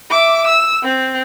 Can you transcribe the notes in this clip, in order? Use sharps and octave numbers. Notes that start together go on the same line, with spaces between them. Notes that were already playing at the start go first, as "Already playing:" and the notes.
E5 D6
E6
C4